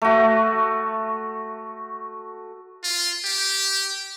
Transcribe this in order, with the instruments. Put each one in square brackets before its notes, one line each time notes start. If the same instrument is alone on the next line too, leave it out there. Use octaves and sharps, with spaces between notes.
[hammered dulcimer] A3 F#4
[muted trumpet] F4
G4